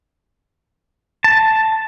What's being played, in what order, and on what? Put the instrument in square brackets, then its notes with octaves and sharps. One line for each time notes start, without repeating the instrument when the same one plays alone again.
[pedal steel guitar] A5